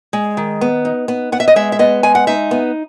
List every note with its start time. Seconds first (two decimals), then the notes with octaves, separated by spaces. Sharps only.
0.13 G#3
0.37 D#3
0.61 B3
0.85 D#4
1.08 B3
1.32 B3 F#5
1.40 E5
1.48 D#5
1.56 G#3 E5
1.72 E5
1.79 B3 D#5
2.03 G#3 G#5
2.15 F#5
2.27 D#4 E5
2.51 B3